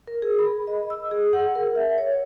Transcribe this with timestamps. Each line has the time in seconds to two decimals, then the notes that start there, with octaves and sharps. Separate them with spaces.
0.07 A#4
0.22 G#4
0.39 B5
0.67 D#5
0.90 E6
1.11 G#4
1.33 F#5
1.55 A#4
1.75 E5
1.98 C#5